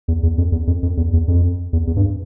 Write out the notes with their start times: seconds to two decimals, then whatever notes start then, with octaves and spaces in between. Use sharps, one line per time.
0.08 E2
0.23 E2
0.38 F2
0.52 E2
0.67 F2
0.83 F2
0.97 E2
1.13 E2
1.28 F2
1.73 E2
1.87 E2
1.96 G2